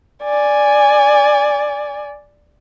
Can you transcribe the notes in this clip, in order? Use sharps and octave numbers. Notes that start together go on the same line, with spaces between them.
D5 G#5